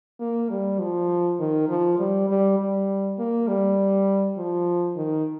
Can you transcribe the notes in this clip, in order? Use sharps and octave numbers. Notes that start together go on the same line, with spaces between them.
A#3
G3
F3
D#3
F3
G3
G3
G3
A#3
G3
F3
D#3